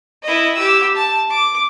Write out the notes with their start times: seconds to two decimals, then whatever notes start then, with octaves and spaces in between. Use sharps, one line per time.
0.23 E4 D#5
0.55 G4 E6
0.96 A5
1.30 D6